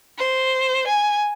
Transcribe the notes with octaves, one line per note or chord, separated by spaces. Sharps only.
C5
G#5